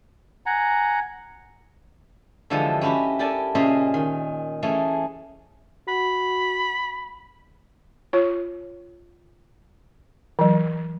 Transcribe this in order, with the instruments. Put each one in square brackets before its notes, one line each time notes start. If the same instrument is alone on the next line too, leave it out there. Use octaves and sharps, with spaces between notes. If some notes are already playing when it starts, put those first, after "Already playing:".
[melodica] F#5 G#5 A#5
[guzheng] D3 E3 F3 G#3 G4 A4
C#4 E4 F#4 G4 B4
G4 A4 A#4 D5 G#5 A5
A#2 C#3 C#4 C5 D#5 E5
D#3
E3 A3 C#4 G#4
[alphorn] F#4 [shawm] B5
[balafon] F4 C#5
E3 F#3